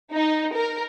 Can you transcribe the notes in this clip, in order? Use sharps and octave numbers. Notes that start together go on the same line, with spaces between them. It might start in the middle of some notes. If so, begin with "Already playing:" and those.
D#4
A#4